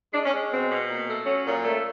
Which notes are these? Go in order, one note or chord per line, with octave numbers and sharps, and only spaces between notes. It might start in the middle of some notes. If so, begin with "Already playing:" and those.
G#3 D4
C#4
G#3
B2 C4
B2
A#2
A3
F#3 C#4
A#2
A3